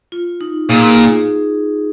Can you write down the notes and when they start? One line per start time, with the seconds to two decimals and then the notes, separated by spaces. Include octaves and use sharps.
0.12 F4
0.41 D#4
0.69 A#2 D#4 G#4